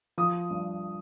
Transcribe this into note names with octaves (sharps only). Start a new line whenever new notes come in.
F3 D#6
G2